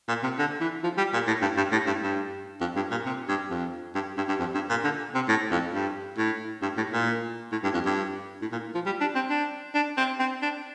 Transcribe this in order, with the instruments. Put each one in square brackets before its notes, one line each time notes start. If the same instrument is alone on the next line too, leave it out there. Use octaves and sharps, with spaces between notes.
[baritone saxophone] A#2
C3
D3
E3
F3
G3
A#2
A2
G2
G2
A2
G2
G2
F2
G2
A#2
C3
G2
F2
G2
G2
G2
F2
G2
A#2
D3
C3
A2
F2
G2
A2
G2
A2
A#2
A2
G2
F2
G2
A2
A#2
F3
G3
D4
C4
D4
D4
C4
C4
D4